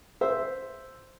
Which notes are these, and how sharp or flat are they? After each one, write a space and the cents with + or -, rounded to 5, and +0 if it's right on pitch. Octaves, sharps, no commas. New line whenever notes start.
C5 +0 E5 +0